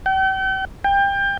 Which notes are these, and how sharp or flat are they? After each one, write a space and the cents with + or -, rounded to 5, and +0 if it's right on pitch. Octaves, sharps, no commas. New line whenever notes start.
G5 -40
G5 +25